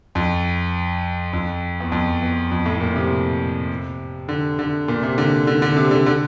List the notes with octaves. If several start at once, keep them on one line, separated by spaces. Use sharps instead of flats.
F2
F2
E2
F2
E2
F2
A2
A#2
C3
D3
D3
A#2
C3
D3
D3
D3
C3
D3
D3